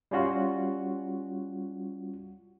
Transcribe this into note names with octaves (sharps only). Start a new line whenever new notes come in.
G3 C#4 F4 F#4